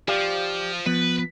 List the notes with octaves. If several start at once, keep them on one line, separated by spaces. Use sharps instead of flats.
F3 G4 D5 F5
F3 B3 B4